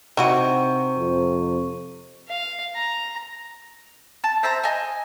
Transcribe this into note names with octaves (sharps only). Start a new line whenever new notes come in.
C3 D#3 E4 F#4 F#5 C#6 D#7
F2
F5
A#5
A5
C5 E5 A5 A#5
D#5 G#5